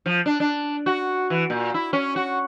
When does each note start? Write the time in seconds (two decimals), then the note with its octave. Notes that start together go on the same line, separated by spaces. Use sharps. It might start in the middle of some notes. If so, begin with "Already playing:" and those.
0.06 F3
0.26 D4
0.40 D4
0.86 F#4
1.30 E3
1.50 A#2
1.74 E4
1.93 C#4
2.16 F#4